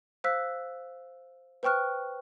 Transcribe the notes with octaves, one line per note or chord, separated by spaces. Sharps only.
C5 F5 E6 F#6 B6
B4 C5 G5 C#6 F6 F#6